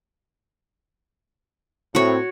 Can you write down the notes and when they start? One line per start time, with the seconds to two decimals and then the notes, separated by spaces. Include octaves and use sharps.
1.95 A2 C4 F#4 C#5